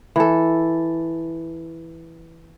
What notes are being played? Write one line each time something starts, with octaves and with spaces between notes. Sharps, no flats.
E3 A4